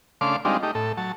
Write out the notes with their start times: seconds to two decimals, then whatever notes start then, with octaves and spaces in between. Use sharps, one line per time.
0.21 C#3 A3 D4 F5 C6 D6
0.45 G3 G#3 C4 D4 D#4 F4
0.63 A3 D#4 G4
0.75 A2 A4
0.97 F#3 A5